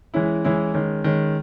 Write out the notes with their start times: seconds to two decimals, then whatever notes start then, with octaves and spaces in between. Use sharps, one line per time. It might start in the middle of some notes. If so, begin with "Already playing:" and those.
0.14 E3 G#3 C#4 E4
0.44 E3 G#3 C#4 E4
0.74 D#3 G#3 C#4
1.04 D#3 G#3 C#4